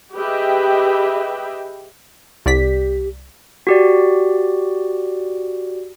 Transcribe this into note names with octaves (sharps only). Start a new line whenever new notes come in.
G4 G#4 B4 D#5 E5 G5
C2 G4 D5 B6
F#4 G4 D5